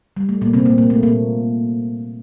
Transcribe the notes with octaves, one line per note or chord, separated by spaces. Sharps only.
G3
A3
A#2 A#3
C3 C4
A#2 A#3
A#2 A#3
A3
A#2 A#3